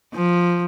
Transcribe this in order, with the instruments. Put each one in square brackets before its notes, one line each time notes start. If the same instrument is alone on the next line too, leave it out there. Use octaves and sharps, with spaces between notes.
[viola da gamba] F3